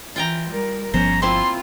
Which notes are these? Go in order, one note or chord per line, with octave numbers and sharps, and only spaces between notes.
E3 F4 G5 A#5
G3 A#4
G1 F3 B3 C#4 C5 A#5
A#3 C4 E4 F4 C6